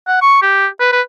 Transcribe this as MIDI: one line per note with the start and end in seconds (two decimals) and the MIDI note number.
0.07 0.20 78
0.22 0.39 85
0.42 0.67 67
0.80 0.89 71
0.92 1.01 71